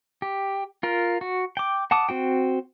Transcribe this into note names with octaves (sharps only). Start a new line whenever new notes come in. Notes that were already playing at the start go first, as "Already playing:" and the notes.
G4
F4 A#4
F#4
G5 D6
F#5 A5 D6 D#6
C4 F#4 G5